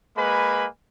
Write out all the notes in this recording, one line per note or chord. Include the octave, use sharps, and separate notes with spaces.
G#3 A#3 B4 G#5 B5